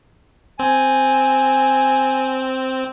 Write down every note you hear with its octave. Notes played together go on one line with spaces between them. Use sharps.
C4 G#5